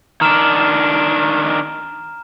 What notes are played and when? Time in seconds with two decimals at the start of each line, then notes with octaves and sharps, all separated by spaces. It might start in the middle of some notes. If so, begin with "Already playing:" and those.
0.21 D#3 D4 A#5 F6 E7